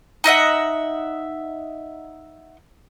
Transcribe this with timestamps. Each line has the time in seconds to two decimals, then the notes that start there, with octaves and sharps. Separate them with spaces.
0.24 D#4 D#5 E5 F#5